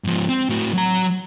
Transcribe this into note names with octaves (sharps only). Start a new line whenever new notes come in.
G#2 F3
C4
A2 F#4
F#3 A#5